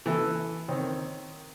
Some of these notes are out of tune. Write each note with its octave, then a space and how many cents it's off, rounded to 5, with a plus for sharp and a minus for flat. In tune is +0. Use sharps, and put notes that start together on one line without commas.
E3 +0 E4 +0 A4 +0
D#3 +0 C4 +0 C#5 +0